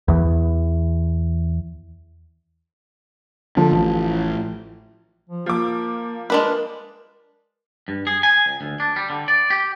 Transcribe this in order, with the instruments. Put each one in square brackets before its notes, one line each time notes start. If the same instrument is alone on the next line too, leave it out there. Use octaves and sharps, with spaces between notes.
[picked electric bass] E2 E3
[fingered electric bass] D3 [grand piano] F3 A4
[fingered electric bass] A1
[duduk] F3
[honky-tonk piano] F3 D6 [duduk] A#3
[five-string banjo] G#3 D4 B4 [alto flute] A#4
[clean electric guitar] G2
G#4
G#5
C#2
D2
D4
G3
D3
D5
G4